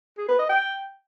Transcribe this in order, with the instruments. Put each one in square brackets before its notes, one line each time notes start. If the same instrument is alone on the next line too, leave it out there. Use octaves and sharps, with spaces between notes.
[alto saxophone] G#4
B4
D#5
G5